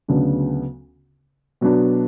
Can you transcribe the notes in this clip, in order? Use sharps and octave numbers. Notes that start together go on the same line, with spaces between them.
D2 C#3 F#3 B3 D4
B2 F#3 B3 D4